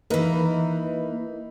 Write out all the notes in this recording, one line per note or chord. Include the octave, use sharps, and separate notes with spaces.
E3 A#3 D#4 A#4 B4